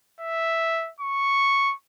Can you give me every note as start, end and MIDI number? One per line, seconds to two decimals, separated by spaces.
0.21 0.91 76
1.00 1.75 85